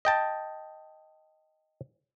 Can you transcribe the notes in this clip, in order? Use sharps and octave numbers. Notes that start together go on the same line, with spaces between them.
D#5 G5 A5